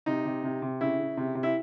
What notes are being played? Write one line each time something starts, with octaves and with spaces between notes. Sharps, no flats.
C3 D#4
C3
C3
C3
C#3 E4
C#3
C3
C3
E4